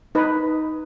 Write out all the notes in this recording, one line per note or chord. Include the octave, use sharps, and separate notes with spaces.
D#4 B4